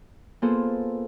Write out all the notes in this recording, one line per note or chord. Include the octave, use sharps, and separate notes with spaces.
A#3 B3 F4 G#4 A4 C5